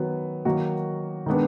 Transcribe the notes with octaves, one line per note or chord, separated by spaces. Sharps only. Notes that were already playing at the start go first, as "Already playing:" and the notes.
Already playing: D#3 F#3 B3
D#3 F#3 A#3 D#4 F#4
D#3 G#3 B3 D4